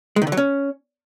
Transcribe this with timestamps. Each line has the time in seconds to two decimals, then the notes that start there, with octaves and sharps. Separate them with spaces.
0.16 G#3
0.22 D#3
0.27 D3
0.32 F#3
0.37 C#4